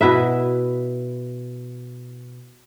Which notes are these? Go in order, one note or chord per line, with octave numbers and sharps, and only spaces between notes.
B2 E4 B4 E5